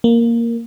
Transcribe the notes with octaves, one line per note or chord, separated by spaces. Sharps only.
A#3